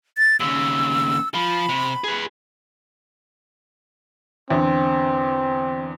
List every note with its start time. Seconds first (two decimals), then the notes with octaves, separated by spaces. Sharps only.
0.18 A6
0.40 D#2 C#3 E6
1.34 F3 B5
1.69 C3
2.04 G#4 B4
4.50 E2 D3 C4